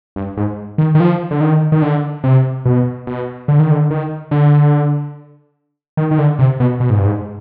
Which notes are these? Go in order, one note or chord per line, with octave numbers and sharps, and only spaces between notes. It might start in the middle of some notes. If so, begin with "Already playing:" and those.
G2
G#2
D#3
D#3
F3
D3
D#3
D#3
D3
C3
B2
B2
D3
D#3
D3
D#3
D3
D#3
D#3
D3
C3
B2
B2
G#2
G2
G#2